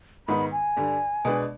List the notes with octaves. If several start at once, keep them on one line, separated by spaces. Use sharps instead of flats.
G#2 D#3 B3 D#4 B5
G#5
G2 D3 G3
B2 G#3 B3 D4